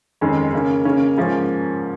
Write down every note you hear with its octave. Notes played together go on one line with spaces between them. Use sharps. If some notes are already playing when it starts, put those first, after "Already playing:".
F2 D#3 G#3 C#4
C#3 A#3 C#4
C#3 A#3 C#4
G#2 F3 A#3 C#4